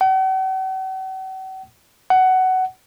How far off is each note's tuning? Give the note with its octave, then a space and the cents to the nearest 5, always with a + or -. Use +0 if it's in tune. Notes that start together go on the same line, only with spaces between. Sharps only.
F#5 +45
F#5 +15